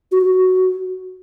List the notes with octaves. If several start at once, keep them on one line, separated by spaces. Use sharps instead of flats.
F#4
F#4